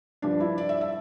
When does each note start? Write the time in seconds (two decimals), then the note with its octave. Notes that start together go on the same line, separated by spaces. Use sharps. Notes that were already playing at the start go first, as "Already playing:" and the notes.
0.22 G2 F3 D4
0.40 E4
0.58 D5
0.69 E5
0.81 E5